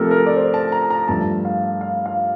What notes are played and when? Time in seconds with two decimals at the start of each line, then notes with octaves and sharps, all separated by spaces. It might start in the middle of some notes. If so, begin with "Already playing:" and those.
Already playing: C3 F3 A3 A4 A#4
0.11 A#4
0.26 D5
0.36 C5
0.54 A5
0.72 A#5
0.90 A#5
1.08 G2 F3 A3 A5
1.45 F5
1.81 F5
2.06 F5